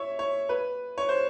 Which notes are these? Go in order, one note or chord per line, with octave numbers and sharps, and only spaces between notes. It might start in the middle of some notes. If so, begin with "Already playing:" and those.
Already playing: C#5 E5
C#5
B4
C#5
C5